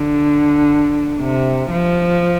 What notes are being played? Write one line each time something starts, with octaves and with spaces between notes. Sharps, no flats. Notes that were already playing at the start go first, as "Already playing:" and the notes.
Already playing: D3
C3
F3